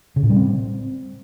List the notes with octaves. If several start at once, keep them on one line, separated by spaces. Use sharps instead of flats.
C#3
A2
G3
C4